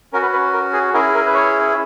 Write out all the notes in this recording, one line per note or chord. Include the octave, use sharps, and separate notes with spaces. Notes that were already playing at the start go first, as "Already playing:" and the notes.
C#4 F#4 A#4
B4
B4
A#4
G#4
C#4 E4 G#4 A#4
A#4
B4
C#5